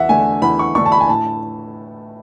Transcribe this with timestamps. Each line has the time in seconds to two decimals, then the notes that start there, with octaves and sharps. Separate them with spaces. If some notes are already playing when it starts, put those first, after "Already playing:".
Already playing: E2 E5 F#5
0.09 D3 A3 D4 G#5
0.42 E2 B5
0.59 C#6
0.75 D3 A3 D4 C#6
0.86 A5
0.92 B5
1.00 G#5
1.09 A2 A5